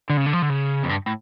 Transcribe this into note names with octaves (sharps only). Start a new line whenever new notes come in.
D3
C#3
D3
F3
D3
C#3
F2
G2
A2